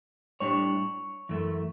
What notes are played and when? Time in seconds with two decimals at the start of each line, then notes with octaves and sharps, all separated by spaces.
0.40 A2 G3 D4 C#5
1.29 F#2 E3 A3